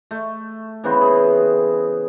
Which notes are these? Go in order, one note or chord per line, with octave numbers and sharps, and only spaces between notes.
A3
C#3 E3 B3 C4
G#4